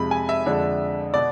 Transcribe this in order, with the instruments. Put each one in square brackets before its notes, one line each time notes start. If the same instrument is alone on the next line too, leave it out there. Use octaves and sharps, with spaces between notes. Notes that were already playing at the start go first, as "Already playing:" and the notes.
Already playing: [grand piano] F2 C3 G#3 B5
G#5
E5
F2 D3 G#3 D4
B2 B3 D5